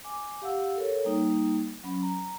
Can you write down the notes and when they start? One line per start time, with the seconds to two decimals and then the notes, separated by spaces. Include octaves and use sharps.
0.04 G#5 D6
0.42 G4 F5 F#5 E6
0.76 A4 A#4 C#5
1.05 G3 A#3 D#4
1.83 F#3 C#4 B5
2.02 A#5